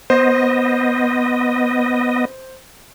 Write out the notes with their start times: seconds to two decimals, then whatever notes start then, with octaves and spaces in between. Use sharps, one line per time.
0.10 B3 C5 D#5